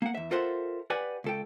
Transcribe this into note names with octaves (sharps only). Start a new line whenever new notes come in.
A#3 F#5
E2 E5
F4 A4 A#4 C5 E5 F#5
G4 B4 D5 F#5 G#5
C#2 A4 G5